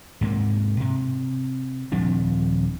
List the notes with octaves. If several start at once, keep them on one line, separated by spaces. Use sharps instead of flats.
G#2 C3 A#3
C3
D#1 F3 C4 D4